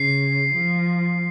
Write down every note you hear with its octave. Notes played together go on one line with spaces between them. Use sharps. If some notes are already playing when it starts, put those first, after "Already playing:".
Already playing: C#3 C7
F3